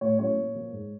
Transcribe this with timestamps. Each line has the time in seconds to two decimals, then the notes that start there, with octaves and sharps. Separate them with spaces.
0.01 A2 C#5
0.19 F#3 A3 C#4 E4 C#5
0.37 A#2
0.55 F3 A#3
0.72 G#2